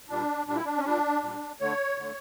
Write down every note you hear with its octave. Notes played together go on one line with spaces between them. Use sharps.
A#2 G3 D4
A#2 G3 D4
E4
D4
C#4
A#2 G3 D4
A#2 G3
D3 A3 C#5
D3 A3